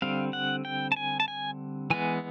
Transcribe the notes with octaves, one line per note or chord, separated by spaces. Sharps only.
D3 G3 C4 F5
F#5
G5
A5
G#5
A5
G#5
E3 G#3 B3 G#5